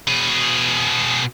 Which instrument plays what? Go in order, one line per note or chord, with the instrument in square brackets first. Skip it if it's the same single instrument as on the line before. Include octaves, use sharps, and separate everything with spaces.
[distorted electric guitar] B2 G#4